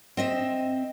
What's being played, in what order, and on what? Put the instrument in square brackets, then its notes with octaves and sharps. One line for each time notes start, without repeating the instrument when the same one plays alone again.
[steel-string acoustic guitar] C4 D#5 E5